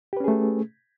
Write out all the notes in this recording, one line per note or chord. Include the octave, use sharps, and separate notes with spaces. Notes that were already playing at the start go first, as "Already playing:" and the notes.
A3 C#4 G4 G#4 B4